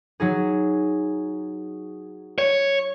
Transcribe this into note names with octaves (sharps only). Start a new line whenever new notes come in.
F#3 D#4 G#4
C#5